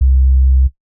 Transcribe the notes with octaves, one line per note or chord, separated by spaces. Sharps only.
C2